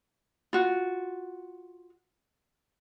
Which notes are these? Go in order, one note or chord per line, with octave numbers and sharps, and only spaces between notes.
F4 F#4